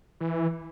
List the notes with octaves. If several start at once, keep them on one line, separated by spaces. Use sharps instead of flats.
E3